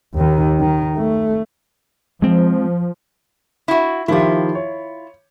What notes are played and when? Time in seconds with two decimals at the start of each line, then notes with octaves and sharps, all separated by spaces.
0.15 D#2 D#3
0.60 D#3
0.97 A3
2.22 F3 G#3 C4
3.68 E4 F#4
4.08 D#3 F3 E4 F4 G4
4.55 C#5